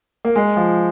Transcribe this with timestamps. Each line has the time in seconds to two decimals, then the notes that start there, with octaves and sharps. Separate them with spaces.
0.25 A#3
0.36 G#3
0.57 F3